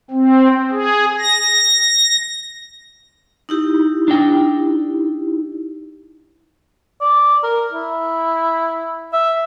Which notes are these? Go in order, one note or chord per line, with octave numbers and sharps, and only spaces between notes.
C4
G#4
A#6
D#4 E4 G4
D4 G5
D5
A#4
E4
E5